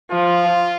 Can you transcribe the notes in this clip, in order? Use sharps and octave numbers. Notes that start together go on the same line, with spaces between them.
F3 F4